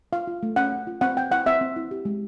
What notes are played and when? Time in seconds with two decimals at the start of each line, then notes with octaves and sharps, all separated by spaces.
0.13 F4 F5
0.28 F4
0.43 A3
0.56 C#4 F#5
0.72 C#4
0.87 F4
1.01 C4 F#5
1.17 C4 G5
1.31 E4 F#5
1.46 C4 E5
1.61 C4
1.76 E4
1.91 G4
2.05 G#3